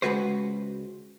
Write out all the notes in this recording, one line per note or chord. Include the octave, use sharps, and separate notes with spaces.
C#2 B2 G#3 F#4 B4 C5